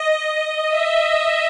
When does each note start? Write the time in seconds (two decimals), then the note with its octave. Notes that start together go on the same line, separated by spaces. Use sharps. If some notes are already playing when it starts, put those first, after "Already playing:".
Already playing: D#5
0.22 D#5
0.68 E5